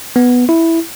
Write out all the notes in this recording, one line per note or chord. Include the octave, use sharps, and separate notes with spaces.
B3
E4